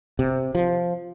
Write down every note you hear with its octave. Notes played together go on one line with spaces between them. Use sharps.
C3
F3